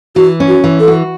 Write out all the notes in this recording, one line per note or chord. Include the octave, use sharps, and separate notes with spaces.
E3 F#4
C#4
F#4
E3
A4
F#4